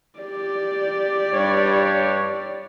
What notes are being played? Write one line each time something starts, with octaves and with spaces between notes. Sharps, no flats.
G4 D5
G2 C#5